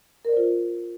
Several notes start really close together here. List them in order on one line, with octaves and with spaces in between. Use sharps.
A#4 D5 C5 F4